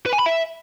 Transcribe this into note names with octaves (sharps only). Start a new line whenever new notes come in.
B4
G#5
B5
E5